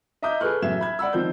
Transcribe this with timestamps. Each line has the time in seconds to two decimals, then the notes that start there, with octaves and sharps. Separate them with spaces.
0.22 D#5 E5 A#5 D6 D#6 G6
0.40 G#4 A4 B4 C#6 F6 F#6
0.62 A1 F#2 E5 G#5 G#6 E7
0.79 E5 B5 G#6
0.99 D5 F#5 B5 E6
1.13 D#3 F3 C4 G6